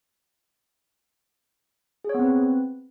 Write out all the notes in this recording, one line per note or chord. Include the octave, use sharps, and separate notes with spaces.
B3 C4 G#4 B4 C#5